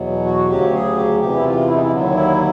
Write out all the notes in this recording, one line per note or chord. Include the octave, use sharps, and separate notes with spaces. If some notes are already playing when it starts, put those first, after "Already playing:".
Already playing: E2 B2 F#3
F#4
D2 C#3 F#3 G4
G#4
G4
E2 C3 E3 G4
E4
F4
E4
D#4
E4
D#2 D3 F#3
E4